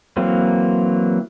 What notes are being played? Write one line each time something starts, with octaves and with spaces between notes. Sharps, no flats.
E3 F#3 A#3 C4